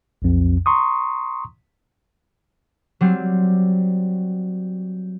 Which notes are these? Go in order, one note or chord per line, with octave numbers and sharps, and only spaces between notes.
B1 F2
A#5 C6 C#6 D#6
F#3 G3 C4